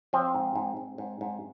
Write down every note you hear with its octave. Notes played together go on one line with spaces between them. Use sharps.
F3 C4
G#2
G#2
G#2
G#2
G#2